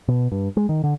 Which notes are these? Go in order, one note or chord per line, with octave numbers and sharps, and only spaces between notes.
B2
G2
G#3
D#3
D3